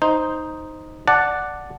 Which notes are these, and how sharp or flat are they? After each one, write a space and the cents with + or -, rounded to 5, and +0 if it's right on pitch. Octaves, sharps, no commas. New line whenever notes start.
D#4 +0 C5 +0
D5 +0 F#5 +0 A5 +0